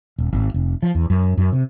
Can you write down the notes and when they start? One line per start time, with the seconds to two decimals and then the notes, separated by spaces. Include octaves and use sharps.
0.18 D#1
0.33 G#1
0.54 F1
0.83 F3
0.95 E2
1.10 F#2
1.37 F#2
1.52 C3